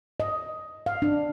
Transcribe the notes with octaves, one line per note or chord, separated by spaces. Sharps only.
D#5
F5
D4